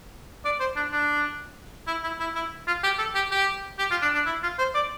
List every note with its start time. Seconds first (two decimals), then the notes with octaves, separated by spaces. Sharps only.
0.45 D5
0.60 C5
0.76 D4
0.92 D4
1.87 E4
2.04 E4
2.20 E4
2.35 E4
2.67 F4
2.83 G4
2.98 A4
3.15 G4
3.31 G4
3.79 G4
3.91 F4
4.02 D4
4.14 D4
4.26 E4
4.43 F4
4.59 C5
4.74 D5